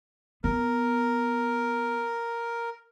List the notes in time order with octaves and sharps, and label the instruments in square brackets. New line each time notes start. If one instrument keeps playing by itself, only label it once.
[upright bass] B3 [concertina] A#4